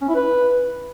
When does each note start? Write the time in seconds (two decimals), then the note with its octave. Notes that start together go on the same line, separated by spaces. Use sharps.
0.02 C#4
0.08 E4
0.15 B4